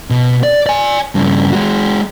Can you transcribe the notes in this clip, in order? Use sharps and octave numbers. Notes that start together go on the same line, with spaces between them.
B2
D5
D5 G#5
G2 C#3
G#3 F#4